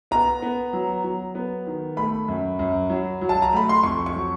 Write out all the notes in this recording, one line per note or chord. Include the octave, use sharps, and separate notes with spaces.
B3 A#5
B3
F#3
F#3
B3
D#3
A3 B5
F#2
F#2
F#3
F#3
A5
A#5
A3 B5
C6
F2 C#6
C#6
F#3